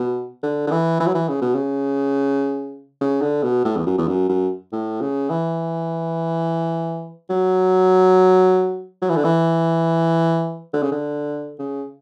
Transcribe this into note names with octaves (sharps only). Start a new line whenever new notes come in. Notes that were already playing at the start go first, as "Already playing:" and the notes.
Already playing: B2
D3
D3
E3
E3
F#3
E3
C#3
B2
C#3
C#3
D3
B2
A2
E2
F#2
E2
F#2
F#2
A2
C#3
E3
F#3
F#3
E3
D3
E3
D3
C#3
D3
C#3